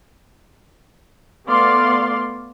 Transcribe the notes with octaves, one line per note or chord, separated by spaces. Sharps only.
A3 B3 D5 F5 C6